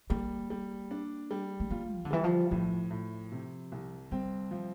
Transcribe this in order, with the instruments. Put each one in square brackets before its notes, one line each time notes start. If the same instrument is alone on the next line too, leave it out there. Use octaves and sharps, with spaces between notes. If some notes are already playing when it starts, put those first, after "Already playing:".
[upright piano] G3 [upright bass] A#3
[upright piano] G3
D4
G3
[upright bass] A3
[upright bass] A#3 [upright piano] F4
[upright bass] E3
D3
[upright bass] E3 [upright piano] G3
[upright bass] F3
[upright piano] A2 [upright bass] F3
[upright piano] A2
C3
C2
[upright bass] G3 [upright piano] C4
[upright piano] F3